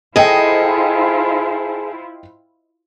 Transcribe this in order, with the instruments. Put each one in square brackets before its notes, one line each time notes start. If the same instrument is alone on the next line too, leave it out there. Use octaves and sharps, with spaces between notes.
[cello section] E4 F4 C5 [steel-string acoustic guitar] G#4 A4 [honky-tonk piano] D#5 G5